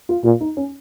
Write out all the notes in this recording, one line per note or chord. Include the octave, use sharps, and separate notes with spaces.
F4
A#2 F4
D#4
C#4